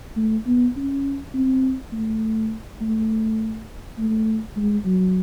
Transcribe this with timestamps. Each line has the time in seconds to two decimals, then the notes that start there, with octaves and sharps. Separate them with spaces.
0.16 A3
0.47 B3
0.76 C#4
1.34 C4
1.93 A3
2.81 A3
3.98 A3
4.56 G#3
4.85 F#3